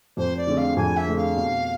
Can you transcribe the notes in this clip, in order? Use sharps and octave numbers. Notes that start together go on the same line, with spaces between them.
F2 C5
D5
D3 A3 C4 G#4
F5
F2 G#5
E5
D3 A3 C4 G#4
F5
B2